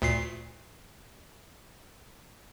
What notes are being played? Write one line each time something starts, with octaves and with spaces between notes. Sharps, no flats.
D2 A#2 C7